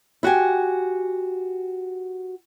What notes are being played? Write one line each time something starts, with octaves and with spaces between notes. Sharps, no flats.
E4 F#4 G4 G#5